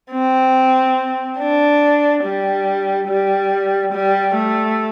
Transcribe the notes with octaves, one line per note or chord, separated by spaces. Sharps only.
C4
D4
G3
G3
G3
A3